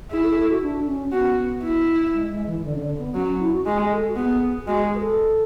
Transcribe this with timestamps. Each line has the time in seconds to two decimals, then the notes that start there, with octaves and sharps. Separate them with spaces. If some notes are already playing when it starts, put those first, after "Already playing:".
0.11 E4 G#4
0.23 A4
0.31 G#4
0.37 A4
0.50 F#4
0.62 D4
0.87 C#4
1.12 B3 F#4
1.63 E4
2.14 G#3
2.31 G#3
2.47 E3
2.59 E3
2.64 D3
2.76 C#3
2.81 D3
2.98 B3
3.15 F#3 C#4
3.28 C#4
3.40 E4
3.52 F#4
3.66 G#3 G#4
3.91 A4
4.08 F#4
4.16 B3 G#4
4.67 G#3 F#4
4.83 G#4
4.95 B4
5.00 A4